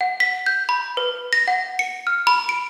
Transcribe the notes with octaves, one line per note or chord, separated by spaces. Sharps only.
F#5
B6
G6
B5
B4
A#6
F#5
C#7
F6
B5
D7